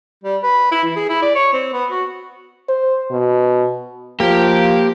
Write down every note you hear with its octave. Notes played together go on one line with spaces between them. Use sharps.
G3
B4
E4
E3
G#4
E4
D5
C#5
C4
B3
F#4
C5
B2
F3 A#3 G4 A#4